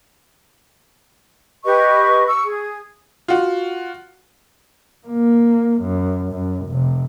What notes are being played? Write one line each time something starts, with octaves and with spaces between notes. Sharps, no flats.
G4 B4 D#5 C#6
C#6 E6
G#4
F4 F#4
A#3
F#2
F#2
F1 C3